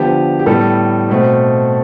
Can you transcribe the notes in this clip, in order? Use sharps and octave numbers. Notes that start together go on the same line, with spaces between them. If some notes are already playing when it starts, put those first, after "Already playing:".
Already playing: D3 F3 B3 G4
G4
A2 G3 B3 A4
B2 A3 C4